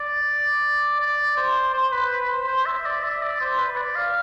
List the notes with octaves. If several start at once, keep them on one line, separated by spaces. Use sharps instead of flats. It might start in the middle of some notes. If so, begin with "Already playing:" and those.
Already playing: D5
D5
C5
C5
B4
B4
C5
C5
E5
D5
E5
D5
C5
B4
D5
F5